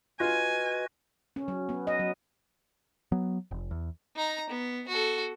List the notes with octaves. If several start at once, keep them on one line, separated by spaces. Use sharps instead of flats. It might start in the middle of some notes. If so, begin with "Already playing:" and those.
F4 F#4 B4 D#5 G#5
C#4
F#3
B3
D#5
F#3
F#3 B3
F1
E2
D#4 A#5
B3
F#4 A4